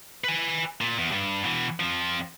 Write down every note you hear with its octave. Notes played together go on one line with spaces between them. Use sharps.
B4 G#5
A#2
E2
G2
B2 E3
F2 F3